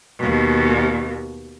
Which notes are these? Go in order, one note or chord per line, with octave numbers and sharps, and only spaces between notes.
D#2 B2